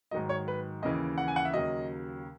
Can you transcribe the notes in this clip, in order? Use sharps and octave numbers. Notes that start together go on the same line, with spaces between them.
G#2 D#3 F#3 D#5
C#5
B4
D#2 C#3 E3 D#5
F#5
G#5
F#5
E5
D#2 C#3 F#3 D#5